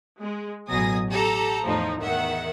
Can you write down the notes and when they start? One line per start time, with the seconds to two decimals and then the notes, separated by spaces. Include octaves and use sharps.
0.19 G#3
0.68 A1 B2 F#3 G#5 D#6 A#6
1.10 G4 A4 A#5
1.65 E2 A2 F3 D#4
2.00 E2 D#3 E5 F#5